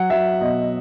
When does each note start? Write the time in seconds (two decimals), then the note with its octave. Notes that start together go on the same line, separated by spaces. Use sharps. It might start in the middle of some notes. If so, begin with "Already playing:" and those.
Already playing: F#3 F#5
0.10 F#3 E5
0.41 B2 D#5